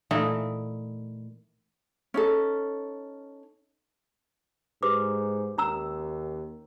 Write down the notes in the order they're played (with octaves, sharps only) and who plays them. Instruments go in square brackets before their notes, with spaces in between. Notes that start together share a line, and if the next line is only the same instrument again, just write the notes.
[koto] A#2 E3 A3 D#4
[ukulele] C#4 D#4 A4
[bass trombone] G#2 [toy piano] G4 B4 D6
[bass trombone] D#2 [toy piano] C#4 A#5 E6